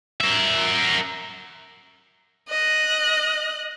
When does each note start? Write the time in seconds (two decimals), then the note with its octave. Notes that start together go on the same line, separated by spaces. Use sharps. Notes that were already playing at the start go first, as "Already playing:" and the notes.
0.20 A#4 E5
2.49 D#5 F#6